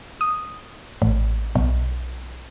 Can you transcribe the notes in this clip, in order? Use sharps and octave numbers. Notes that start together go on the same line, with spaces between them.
D#6
A1
B1